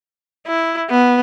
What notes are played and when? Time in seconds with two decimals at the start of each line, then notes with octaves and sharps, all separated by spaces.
0.48 E4
0.90 B3